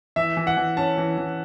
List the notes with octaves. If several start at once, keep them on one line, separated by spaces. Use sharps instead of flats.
E3 E5
E3
F#5
E3
C#4 A5
E3
E3